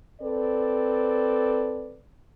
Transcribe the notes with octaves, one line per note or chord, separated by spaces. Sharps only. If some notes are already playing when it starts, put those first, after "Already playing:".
C4 A4 B4 D5